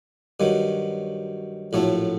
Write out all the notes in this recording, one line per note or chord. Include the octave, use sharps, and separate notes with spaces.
G2 D#3 F#3
A#1 A2 F#3 A3